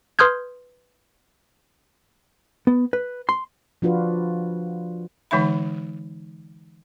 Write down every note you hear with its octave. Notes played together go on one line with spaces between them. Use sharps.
B4 C6 D#6 F6 G6 G#6
B3
B4
C6
F3 D4 F4 F#4 B4
D3 E3 G#3 D#4 E5 B5